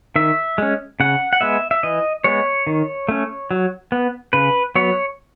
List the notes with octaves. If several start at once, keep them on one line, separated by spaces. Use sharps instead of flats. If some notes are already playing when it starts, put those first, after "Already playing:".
D#3 E5
G#3 C#4
C#3 F#5
F#5
G#3 B3 E5
E5
E3 D#5
G#3 B3 C#5
D#3
A3 C#4
F#3
B3
C#3 B4
F#3 B3 C#5